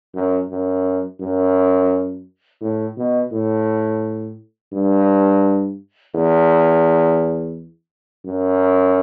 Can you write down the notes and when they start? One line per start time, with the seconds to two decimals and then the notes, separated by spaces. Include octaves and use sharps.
0.15 F#2
0.50 F#2
1.21 F#2
2.61 A2
2.97 B2
3.32 A2
4.73 G2
6.15 E2
8.26 F#2